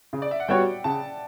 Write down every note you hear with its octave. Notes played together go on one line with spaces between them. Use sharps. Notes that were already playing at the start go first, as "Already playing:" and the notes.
C#3
D5
E5
F#5
G3 B3 F#4 C#5 G5
C#3 A5